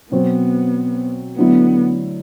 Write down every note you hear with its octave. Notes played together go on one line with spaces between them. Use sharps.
B2 F#3 B3 C4 F#4 C5
D3 F#3 A3 B3 E4